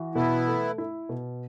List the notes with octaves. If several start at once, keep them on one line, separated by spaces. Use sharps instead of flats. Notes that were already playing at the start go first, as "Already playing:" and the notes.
Already playing: E3 F#4
B2 B3 E4
A3
E4
B2